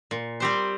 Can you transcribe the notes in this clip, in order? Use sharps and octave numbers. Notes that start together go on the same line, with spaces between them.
A#2
G3 C4 G4 C5